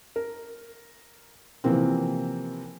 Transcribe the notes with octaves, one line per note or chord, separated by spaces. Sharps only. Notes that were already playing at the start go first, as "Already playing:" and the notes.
A#4
C3 E3 F3 A#3 C4